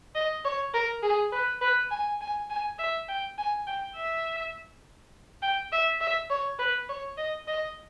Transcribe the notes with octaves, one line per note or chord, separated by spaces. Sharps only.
D#5
C#5
A#4
G#4
B4
B4
G#5
G#5
G#5
E5
G5
G#5
G5
E5
G5
E5
E5
C#5
B4
C#5
D#5
D#5